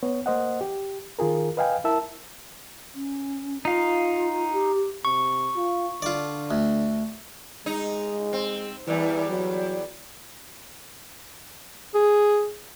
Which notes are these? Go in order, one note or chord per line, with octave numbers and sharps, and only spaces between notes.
B3 C#5
A#3 C5 D#5 F#5
G4
D#3 F4 G#4 A#4
B4 D#5 F5 G5 G#5
E4 A#4 E5 A5 E6
C#4
D#4 F4 F5
G4
C3 C#6
F4
D3 F4 D5
D2
G#3 D#4
C4
E2 E3 G3
F#3
G#4